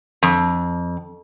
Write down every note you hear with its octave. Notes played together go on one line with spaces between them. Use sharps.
F2